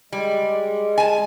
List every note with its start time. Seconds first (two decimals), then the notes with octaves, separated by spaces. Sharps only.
0.12 G3 G#3
0.98 G#5 A5